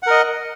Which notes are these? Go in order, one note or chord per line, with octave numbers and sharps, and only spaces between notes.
A#4 D#5 F#5